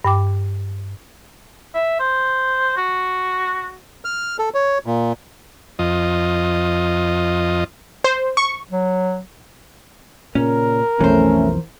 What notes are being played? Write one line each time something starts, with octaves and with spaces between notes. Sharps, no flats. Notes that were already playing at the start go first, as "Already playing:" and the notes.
G2 G5 D6
E5
C5
F#4
F6
A4
C#5
A#2
F2 F4 D#5
C5
C#6
F#3
A#2 C#3 C#4 A#4
B1 F2 E3 A3 C#4 C5